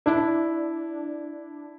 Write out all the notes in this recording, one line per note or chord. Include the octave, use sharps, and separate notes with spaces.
D4 E4